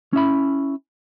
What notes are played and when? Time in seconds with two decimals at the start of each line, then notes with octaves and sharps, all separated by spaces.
0.13 C#4 E4 E5 B5